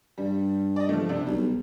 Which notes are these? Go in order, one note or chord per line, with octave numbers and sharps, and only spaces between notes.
G2 G3
D5 D#5
F3 A3
C3 D4
B1 G3